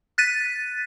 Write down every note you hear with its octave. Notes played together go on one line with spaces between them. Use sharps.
F#6 A6 B6 D#7